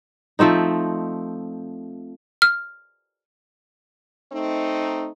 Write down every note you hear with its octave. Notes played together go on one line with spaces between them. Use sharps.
F3 A3 C4 D#4
F6
A3 C4 D#4